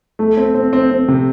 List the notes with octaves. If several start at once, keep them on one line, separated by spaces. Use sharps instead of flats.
A3
C4
C4
C4
C4
C3